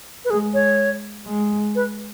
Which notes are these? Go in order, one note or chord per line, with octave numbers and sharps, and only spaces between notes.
B4
G#3 G#4
C#5
G#3
B4